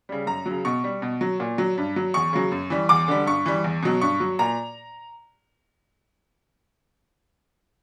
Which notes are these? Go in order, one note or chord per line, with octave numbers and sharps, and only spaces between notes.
C#3 G3
F#2 A#5
F#3
C#3
B2 C#6
G3
B2
F#3
A#2
F#3
G2
F#3
E2 C#6
C#3 F#3
F#2
E3 G3
E2 D6
D3 G3
G2 C#6
E3 G3
E2
B2 F#3
G2 C#6
F#3
A#2 A#5